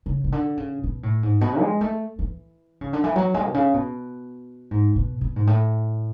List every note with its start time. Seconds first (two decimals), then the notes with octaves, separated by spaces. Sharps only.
0.06 C#3
0.24 C#3
0.32 D3
0.57 C#3
0.84 B2
1.03 A2
1.23 G#2
1.41 B2
1.61 G#3
1.81 A3
2.19 E3
2.81 C#3
2.93 D3
3.04 E3
3.16 F#3
3.34 G#3
3.46 B2
3.54 C#3
3.74 B2
4.71 G#2
4.96 B2
5.21 B2
5.36 G#2
5.47 A2